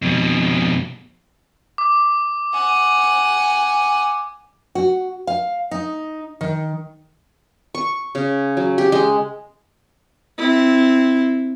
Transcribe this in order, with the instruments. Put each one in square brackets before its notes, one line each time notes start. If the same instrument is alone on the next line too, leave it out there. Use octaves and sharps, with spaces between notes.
[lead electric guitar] F2 B2
[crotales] D6
[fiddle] F#5 G#5
[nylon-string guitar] F#4
F5
D#4
D#3
[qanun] C#6
C#3
F#3
G4
G#3
[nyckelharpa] C4 E4